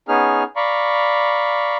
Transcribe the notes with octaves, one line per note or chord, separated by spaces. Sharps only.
B3 C#4 D#4 G#4 F6
D5 F5 A#5 B5 C#6